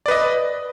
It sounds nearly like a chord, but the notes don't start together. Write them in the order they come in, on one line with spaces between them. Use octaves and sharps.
D5 B4 D#5